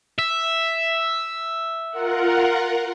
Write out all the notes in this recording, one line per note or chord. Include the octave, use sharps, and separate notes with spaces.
E5
F4 A#4 F#5